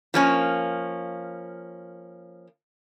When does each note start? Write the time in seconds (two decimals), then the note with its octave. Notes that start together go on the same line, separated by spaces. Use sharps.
0.14 F3 A#3 C#4